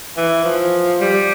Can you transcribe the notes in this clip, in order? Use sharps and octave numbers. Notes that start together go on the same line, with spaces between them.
E3
F3
G3